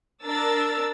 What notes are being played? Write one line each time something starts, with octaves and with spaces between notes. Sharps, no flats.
D4 A#4 E6 A6